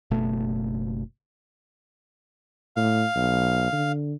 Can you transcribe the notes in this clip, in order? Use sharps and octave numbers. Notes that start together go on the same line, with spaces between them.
F#1 B2 A3
A2 F5
B1
D3